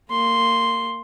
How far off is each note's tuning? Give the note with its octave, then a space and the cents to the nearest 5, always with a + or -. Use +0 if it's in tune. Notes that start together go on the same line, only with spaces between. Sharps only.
A#3 -20 C6 +0